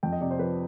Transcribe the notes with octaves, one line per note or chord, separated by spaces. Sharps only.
F2 G5
D#5
C3 D5
C5
F3 B4